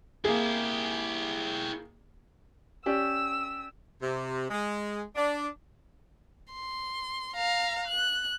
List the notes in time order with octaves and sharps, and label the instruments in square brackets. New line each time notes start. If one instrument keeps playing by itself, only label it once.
[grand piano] A#3 G#4 [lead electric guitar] E4 G4
[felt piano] C#4 G4 D5 [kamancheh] E6
[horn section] C3
G#3
D4
[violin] C6
F5 A#5
F#6